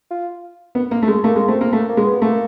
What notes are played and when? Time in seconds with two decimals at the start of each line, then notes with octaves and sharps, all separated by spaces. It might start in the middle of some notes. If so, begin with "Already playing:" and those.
0.11 F4
0.75 B3
0.91 A#3
1.03 A3
1.08 G#3
1.24 A3 A#3
1.36 G#3
1.48 A3 C4
1.61 A#3
1.73 A3 A#3
1.89 A#3
1.97 G#3
2.05 B3
2.21 A3 A#3